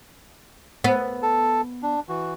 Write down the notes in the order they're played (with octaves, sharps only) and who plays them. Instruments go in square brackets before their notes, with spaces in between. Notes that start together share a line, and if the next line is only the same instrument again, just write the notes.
[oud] B3
[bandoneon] A4 A5
D4
E3 F#4